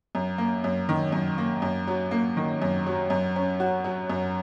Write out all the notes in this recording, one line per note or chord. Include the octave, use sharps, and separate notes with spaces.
F#2
A#3
F#2
D#3
F#2
A#3
F#2
F#3
A#3
D#3
F#2
F#3
F#2
C#4
F#4
F#3
F#2